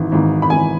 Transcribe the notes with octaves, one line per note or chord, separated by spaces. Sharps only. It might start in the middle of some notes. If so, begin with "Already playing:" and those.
Already playing: G#1 G#2 E3
G#1 G#2 E3
B5
G#1 G#2 E3 G#5